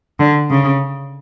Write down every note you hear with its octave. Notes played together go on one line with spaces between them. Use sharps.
D3
C#3